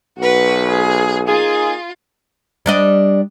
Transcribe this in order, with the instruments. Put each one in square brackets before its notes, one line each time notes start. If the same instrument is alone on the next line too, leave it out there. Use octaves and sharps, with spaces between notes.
[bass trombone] B1 [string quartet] F#4 B4
[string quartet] G#4
[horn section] A#3 D#4 G#4 [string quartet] F4
[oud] G3 D4 D#5